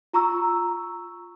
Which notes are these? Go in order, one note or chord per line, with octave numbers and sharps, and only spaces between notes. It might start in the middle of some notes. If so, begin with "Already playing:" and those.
F4 A#5 C#6 E6